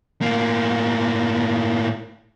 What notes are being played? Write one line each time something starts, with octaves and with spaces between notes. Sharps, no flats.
A2 A#3